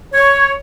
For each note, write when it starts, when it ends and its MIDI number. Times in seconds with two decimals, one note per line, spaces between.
0.14 0.51 73